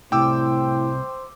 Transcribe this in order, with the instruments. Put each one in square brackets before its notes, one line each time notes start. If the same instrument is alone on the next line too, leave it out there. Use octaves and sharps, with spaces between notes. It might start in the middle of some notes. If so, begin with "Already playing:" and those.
[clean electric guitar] C2 C3 [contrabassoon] A2 [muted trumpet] C5 [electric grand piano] G5 D6 E6